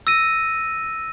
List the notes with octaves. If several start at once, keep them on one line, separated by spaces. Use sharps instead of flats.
E6 A#6 D#7